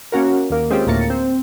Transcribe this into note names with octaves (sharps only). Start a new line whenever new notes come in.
A#3 C#4 F#4 A#4
D#2 A#3
G#3 C4 C#4 F4 G4
D2 A2 A#3 A#5 A6 C#7
C4